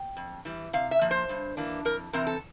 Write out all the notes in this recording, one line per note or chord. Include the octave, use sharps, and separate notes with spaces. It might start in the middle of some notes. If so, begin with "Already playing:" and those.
Already playing: G5
F2
E3 G3
C3 F5
E5
F3 A#3
C5
G2
E3 A#3 D4
F2 A#4
C3 E3 C4 A#4
A4